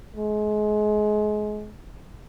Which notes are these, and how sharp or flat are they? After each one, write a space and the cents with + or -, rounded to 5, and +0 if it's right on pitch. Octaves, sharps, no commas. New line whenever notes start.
G#3 +30